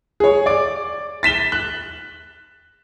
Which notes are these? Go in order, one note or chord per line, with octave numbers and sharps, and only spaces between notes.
G#4 C#5
D5 D6
A6 B6 E7 G7
F#6